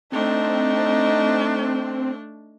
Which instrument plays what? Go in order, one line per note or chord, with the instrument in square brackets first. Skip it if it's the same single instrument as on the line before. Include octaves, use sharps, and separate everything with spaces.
[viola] A3 D4 [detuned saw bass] C4 [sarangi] D#4